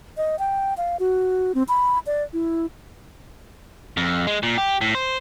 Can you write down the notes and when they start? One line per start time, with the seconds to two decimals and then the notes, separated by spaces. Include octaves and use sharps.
0.17 D#5
0.39 G5
0.77 F5
1.00 F#4
1.55 C4
1.68 B5
2.06 D5
2.33 E4
3.97 F2
4.27 G#3
4.43 A#2
4.58 G4
4.81 A2
4.95 C5